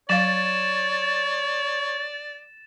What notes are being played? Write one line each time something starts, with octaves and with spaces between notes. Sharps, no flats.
F#3 C#5 D5 F5 A6 E7